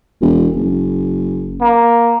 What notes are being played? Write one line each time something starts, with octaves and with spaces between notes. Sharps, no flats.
E1
F#1
A#3